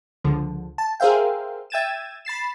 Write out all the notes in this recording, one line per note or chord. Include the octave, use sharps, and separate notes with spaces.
C#2 D3 F3
A5
G#4 A#4 C5 E5 F5 G5
E5 G5 G#6 A6 D#7 E7
B5 A6 C7 E7